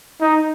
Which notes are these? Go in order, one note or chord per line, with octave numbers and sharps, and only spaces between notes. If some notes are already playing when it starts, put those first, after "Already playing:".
D#4